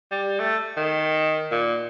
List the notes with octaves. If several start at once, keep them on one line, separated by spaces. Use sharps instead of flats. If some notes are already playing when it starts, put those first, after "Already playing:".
G3
A3
D#3
A#2